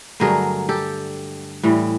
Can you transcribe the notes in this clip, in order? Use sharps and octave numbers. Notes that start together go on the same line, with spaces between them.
G2 D3 F#3 A3 G#4 A#4
G4 A4
A2 E3 G3